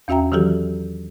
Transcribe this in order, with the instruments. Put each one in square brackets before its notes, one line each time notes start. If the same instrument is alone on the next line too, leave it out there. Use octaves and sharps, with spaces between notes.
[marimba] E2 C#4 F#4 E5 G5 A#5
D#3 E3 F#3 F#4 G4 A4